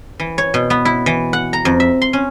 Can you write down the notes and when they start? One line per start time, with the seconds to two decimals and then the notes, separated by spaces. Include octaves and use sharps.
0.20 E3
0.38 C#5
0.54 B2
0.70 B3
0.85 E4
1.06 E3
1.33 F#5
1.53 A#5
1.65 F2
1.80 E5
2.02 C6
2.13 C#4